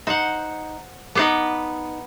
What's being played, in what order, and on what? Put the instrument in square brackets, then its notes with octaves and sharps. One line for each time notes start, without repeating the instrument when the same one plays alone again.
[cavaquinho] D#4 [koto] C5 F#5
[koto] B3 B4 [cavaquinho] D#4 C5 D6